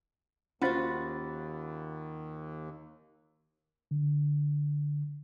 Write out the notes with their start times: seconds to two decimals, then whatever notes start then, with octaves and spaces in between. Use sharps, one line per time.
0.62 D#2 C#4 F4 F#4 C5 F#5 B5 A6
3.91 D3